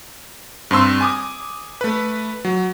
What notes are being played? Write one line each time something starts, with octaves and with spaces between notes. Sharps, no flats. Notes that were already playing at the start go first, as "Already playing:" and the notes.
G2 C4 C6 E6
G#5 D6 D#6
A3 B4
F#3